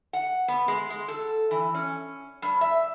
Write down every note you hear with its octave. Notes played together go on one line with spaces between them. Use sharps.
F#5
B3
G#3
G#3
A4
E3
C#4
G2
E5